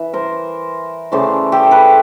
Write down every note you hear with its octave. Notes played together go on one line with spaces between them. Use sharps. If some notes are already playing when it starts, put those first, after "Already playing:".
Already playing: E3
A#4 C5
C#3 E3 A3 C5 D5
G4 A4
A4 B4